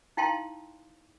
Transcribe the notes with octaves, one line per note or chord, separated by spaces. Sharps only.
D#4 E4 F5 G5 A5 C6